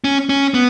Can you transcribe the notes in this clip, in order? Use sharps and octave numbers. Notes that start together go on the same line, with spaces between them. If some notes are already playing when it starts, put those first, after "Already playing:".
C#4
C#4
B3